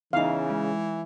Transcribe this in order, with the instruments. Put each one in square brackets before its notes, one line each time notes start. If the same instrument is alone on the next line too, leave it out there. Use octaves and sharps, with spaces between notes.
[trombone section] C#3 [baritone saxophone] E3 [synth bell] B3 E5 [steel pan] D#4 F5
[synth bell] G#3